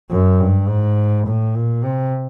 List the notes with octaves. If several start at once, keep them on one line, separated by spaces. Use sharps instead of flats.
F#2
G2
G#2
A2
A#2
C3